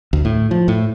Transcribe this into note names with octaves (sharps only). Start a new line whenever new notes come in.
D2
A2
F3
A2